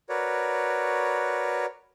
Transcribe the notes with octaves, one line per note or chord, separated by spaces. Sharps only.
F#4 A#4 B4 C#5 D5